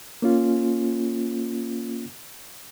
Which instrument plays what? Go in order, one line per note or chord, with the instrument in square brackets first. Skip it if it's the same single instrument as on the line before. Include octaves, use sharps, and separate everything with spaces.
[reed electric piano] A#3 C#4 F4